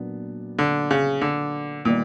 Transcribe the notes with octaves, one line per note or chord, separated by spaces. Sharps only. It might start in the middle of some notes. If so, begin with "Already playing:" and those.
Already playing: A#2 F#3 B3 D4
D3
C#3
D3
A#2 D#3 G3 B3 D#4